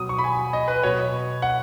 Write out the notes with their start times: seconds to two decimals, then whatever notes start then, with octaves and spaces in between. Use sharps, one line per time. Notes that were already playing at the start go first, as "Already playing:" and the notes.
Already playing: B2 F#3 D#6
0.09 C#6
0.19 B5
0.24 G#5
0.53 D#5
0.68 B4
0.83 B2 F#3 C#5
1.42 F#5